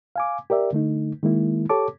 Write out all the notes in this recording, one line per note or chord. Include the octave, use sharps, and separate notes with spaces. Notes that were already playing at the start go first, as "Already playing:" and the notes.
F5 G#5 D6
G4 A#4 D5 E5
D3 A3 D#4
D#3 G#3 A#3 E4
G4 A4 C#5 A5 D6